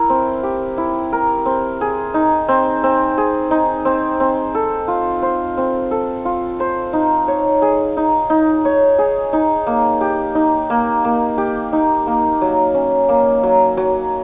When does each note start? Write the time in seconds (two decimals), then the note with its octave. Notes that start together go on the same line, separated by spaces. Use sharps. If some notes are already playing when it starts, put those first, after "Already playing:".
Already playing: E4 A#4
0.10 C4
0.43 G4
0.78 E4
1.13 A#4
1.46 C4
1.81 G#4
2.14 D#4
2.48 C4
2.83 C4
3.18 G#4
3.51 D#4
3.85 C4
4.20 C4
4.55 A4
4.88 F4
5.22 C5
5.57 C4
5.91 A4
6.25 F4
6.60 C5
6.93 D#4
7.28 C#5
7.62 G#4
7.97 D#4
8.30 D#4
8.65 C#5
8.99 G#4
9.33 D#4
9.67 A#3
10.01 G4
10.35 D#4
10.70 A#3
11.04 A#3
11.38 G4
11.73 D#4
12.07 A#3
12.41 F#3
12.74 C#4
13.09 A#3
13.43 F#3
13.77 F#3